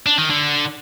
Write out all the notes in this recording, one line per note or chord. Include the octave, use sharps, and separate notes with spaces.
D4
D#3
D3